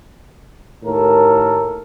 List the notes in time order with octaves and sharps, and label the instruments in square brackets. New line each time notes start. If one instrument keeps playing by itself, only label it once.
[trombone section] D#2 A2 A4 A#4